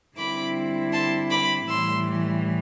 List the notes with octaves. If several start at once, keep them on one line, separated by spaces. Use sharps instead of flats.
D3 G3 C4 E4 B5 D6
A5 C6
B5 D6
A2 E3 G3 C6 E6